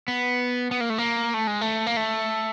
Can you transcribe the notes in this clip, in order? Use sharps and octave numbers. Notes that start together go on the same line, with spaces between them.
B3
B3
A#3
A3
A#3
A3
G#3
A3
A#3
A3